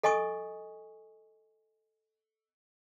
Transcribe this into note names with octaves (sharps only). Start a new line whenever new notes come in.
A4 D#5 G#5 C#6 D#6